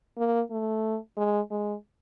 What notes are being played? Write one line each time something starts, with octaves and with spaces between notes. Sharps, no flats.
A#3
A3
G#3
G#3